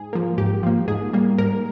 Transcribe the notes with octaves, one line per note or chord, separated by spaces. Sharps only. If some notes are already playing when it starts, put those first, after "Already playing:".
Already playing: G#2 G#4
F3 A#3
G#2 G4
F3 A#3
G#2 G#4
G3 A#3
G#2 A#4